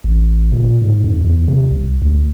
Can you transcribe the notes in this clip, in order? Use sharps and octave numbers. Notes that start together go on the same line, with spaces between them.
A1
A#2
G#2
F2
E2
C3
C2
D2